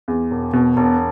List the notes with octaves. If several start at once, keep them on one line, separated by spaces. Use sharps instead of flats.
E2
E1
B2
E1